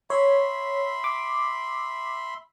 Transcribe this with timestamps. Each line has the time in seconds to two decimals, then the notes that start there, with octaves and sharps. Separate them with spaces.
0.10 C#5 E5 B5 C6
1.04 D6